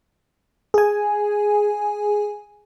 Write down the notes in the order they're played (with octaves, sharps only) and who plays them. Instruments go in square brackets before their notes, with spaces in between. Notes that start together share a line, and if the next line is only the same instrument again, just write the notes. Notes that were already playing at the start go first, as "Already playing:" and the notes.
[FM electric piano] G#4 G#5